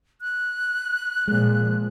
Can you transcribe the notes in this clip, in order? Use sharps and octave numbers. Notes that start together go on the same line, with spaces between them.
F#6
A#2 F3 G#3